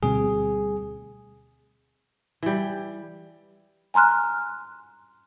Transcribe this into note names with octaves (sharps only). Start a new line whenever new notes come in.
D2 B2 G3 C4 G#4
E3 G3
G#5 A#5 C6 F6 F#6